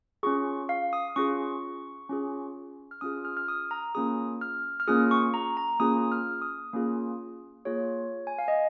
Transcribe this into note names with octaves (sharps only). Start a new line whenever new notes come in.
C#4 F4 G#4 C#6
F5
D#6
C#4 F4 G#4 C#6
C#4 F4 G#4
F6
C#4 F4 G#4 D#6
F6
F6
D#6
A#5
A#3 C#4 F4 G#4 D#6
F6
F6
A#3 C#4 F4 G#4 D#6
C#6
A#5
A#5
A#3 C#4 F4 G#4 D#6
F6
D#6
A#3 C#4 F4 G#4
A#3 F4 G#4 C#5
G#5
F5
D#5